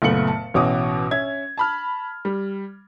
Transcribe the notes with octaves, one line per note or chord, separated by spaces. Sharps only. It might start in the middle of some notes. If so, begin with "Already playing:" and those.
F#1 A#2 A3 B3 C#7 F#7
A5
A1 B2 C#4 F#4 D6 D#6
C#4 E5 G#6
A5 B5 F6
G3